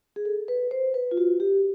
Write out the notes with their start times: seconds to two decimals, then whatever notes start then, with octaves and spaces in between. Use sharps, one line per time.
0.16 G#4
0.25 A4
0.48 B4
0.71 C5
0.94 B4
1.11 F4
1.17 F#4
1.40 G4